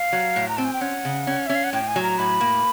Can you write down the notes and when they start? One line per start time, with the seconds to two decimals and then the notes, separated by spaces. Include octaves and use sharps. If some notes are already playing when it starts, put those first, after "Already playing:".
Already playing: F5
0.13 F#3
0.36 A2
0.48 A#5
0.57 C4 A5
0.65 G#5
0.73 G5
0.81 C#4 F#5
1.05 C#3
1.27 C#4
1.47 C#4 E5
1.55 F5
1.64 F#5
1.73 A2 G5
1.88 G#5
1.96 F#3
2.03 A#5
2.18 A2 B5
2.41 A#3